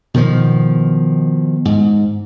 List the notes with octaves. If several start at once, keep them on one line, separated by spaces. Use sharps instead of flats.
B2 D#3 F3
G#2